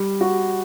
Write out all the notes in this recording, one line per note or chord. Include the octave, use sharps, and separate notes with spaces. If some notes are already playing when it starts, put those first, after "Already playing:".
Already playing: G3
F#4